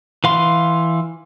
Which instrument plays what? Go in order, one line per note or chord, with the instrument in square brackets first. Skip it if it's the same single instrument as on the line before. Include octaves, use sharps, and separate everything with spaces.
[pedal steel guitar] E3 F5 C6